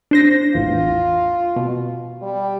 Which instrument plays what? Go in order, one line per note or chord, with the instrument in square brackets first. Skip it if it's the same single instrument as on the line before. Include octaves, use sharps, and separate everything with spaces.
[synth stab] D4 C5 A#6
[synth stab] A1 E2 [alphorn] F4
[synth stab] B2
[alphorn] G3